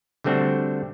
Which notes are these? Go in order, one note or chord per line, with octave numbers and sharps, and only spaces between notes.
D3 G3 A3 C4 D4 F#4